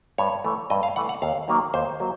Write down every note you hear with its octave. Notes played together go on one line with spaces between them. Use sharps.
G2 C#5
E3 A3
G2 D#5
F5
E3 A3 F#5
F#5
D#2 F5
D#3 F#3 A#3
D#2 C5
F#3 A#3